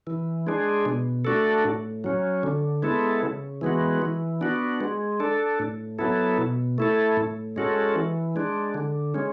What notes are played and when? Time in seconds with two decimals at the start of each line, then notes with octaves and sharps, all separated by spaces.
0.07 E3
0.47 G#3 D4 G#4
0.86 B2
1.25 A3 D4 F#4 A4
1.65 A2
2.04 F#3 C#4
2.43 D3
2.82 G#3 B3 E4 A4
3.23 C#3
3.61 E3 G#3 B3 F#4
4.02 E3
4.41 B3 D4 F#4
4.81 G#3
5.20 D4 A4
5.60 A2
5.99 F#3 B3 E4 A4
6.38 B2
6.78 A3 E4 A4
7.17 A2
7.56 G#3 C#4 F#4 A4
7.95 E3
8.36 G#3 D4
8.74 D3
9.15 G#3 C#4